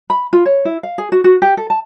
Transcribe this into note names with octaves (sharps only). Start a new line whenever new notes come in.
B5
F4
C#5
E4
F5
G#4
F#4
F#4
G4
A4
A5